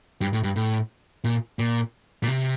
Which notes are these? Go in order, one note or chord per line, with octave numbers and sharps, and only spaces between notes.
G2
A2
G2
A2
A#2
A#2
A#2
C3